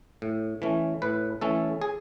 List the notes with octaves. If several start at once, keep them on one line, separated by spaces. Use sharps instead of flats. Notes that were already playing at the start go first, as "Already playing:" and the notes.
A2
E3 A3 C#4
A2 B4
E3 A3 C#4 A4
G#4